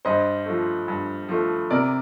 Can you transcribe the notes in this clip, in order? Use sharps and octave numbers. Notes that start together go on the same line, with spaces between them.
G2 C5 D#5
F3 A3
G2
F3 A3
C3 A#4 D5